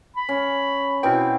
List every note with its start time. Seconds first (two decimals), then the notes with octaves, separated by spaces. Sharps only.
0.16 B5
0.29 C#4
1.03 B2 B3 C4 E4 G5